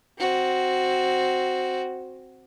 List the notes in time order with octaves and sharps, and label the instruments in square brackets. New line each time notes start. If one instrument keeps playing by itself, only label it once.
[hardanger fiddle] C4 F#4